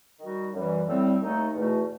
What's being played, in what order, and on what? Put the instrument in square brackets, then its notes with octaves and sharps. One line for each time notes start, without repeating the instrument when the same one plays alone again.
[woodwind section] D#3 G3 D#4 F#4
F#2 E3 G3
A2 G3 C4
D#2 D#3 A3 D#4
E2 B2 A3